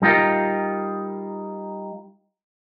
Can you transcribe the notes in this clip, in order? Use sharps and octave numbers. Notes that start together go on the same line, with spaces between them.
G3 D#4 F4 A#4